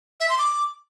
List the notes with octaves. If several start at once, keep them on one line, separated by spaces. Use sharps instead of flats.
E5
C6
D6